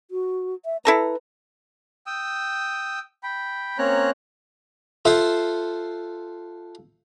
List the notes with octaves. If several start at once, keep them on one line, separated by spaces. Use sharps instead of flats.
F#4
E5
E4 A4 B4 A#5
G5 D#6 E6
G5 B5
A#3 C4 C#4 C#5 A#5 F#6
F4 A4 C5 E5 F#5 C6